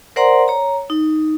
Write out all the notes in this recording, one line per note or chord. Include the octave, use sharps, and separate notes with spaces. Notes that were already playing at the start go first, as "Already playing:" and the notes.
A#4 C5 D5 F#5 A#5 C6
C#5 A#5
D#4